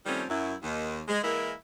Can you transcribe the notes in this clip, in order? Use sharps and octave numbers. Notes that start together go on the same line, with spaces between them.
D#3 F3 G3 A3 C4 C#4
F#2 F#3 E4
D#2 D#3
G#3
E3 G#3 A#3 E4 A#4